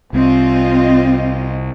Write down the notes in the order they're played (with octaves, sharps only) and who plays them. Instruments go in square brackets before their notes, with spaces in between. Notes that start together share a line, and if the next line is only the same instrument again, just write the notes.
[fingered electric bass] C2 [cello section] C4 F4 D#5